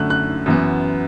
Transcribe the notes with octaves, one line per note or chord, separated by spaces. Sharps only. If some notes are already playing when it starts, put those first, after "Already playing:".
Already playing: F#2 D3 A3 F#6
F#6
F#2 E3 B3